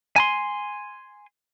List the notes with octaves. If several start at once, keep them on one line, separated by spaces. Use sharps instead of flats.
G#5 A#5 C6